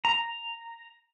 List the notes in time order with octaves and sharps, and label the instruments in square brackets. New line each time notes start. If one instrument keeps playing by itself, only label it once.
[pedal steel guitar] A#5